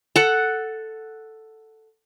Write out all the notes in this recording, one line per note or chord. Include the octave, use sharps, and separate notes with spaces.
A4 F#5